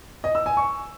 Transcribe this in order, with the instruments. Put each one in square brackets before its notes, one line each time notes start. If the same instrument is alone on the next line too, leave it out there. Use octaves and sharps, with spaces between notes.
[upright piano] D#5
E6
G#5
C#6